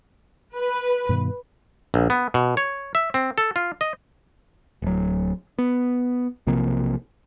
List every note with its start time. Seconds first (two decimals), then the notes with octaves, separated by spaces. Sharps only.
0.56 B4
1.09 G2 B2 D#3
1.94 A#1
2.10 B3
2.34 B2
2.57 C#5
2.95 E5
3.14 C4
3.38 A4
3.56 F4
3.81 D#5
4.82 D1 F#3
5.58 B3
6.47 B1 C3 F3 A#3